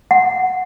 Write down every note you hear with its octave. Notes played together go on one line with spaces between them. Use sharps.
F#5